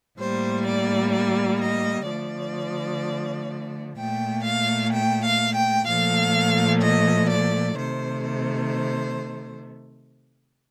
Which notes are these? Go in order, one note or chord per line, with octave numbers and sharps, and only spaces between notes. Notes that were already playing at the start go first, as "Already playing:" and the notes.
A2 G3 A#3 C5
D5
D5
D#5
D3 F3 A3 D5
A#2 A3 G5
F5
G5
F5
G5
A#2 F3 A3 F5
D#5
D5
C3 D#3 A3 C5
C5